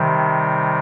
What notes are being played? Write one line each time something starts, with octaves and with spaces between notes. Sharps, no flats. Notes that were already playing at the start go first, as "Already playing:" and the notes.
Already playing: C3 D#3 G3